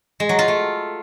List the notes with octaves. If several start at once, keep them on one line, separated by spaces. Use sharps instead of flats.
G#3
F#3
F4
A3